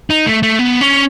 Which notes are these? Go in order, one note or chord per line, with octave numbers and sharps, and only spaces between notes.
D#4
A3
A3
B3
C#4